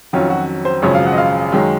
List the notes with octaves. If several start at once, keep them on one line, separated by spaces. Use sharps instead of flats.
F2 D#3 F#3 C#4 F4
F#4
C5
G#1 F#2 C#3 F3 C#5
F5
F#5
D#5
F5
F#2 D#3 G#3 C#4